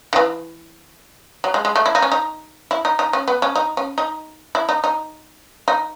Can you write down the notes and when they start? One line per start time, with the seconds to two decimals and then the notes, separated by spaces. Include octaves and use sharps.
0.13 D#3
0.16 E3
1.44 F#3
1.54 G#3
1.65 G#3
1.76 A3
1.86 E4
1.95 D#4
2.02 C#4
2.12 D#4
2.71 E4
2.85 D#4
2.99 D#4
3.13 C#4
3.28 B3
3.42 C#4
3.56 D#4
3.77 C#4
3.98 D#4
4.55 E4
4.69 D#4
4.84 D#4
5.68 D#4